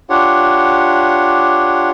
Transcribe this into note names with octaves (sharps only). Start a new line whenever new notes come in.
D4 F4 G4 C#5 F#5